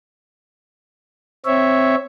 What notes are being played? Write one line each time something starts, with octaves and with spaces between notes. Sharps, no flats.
C4 C#5 E5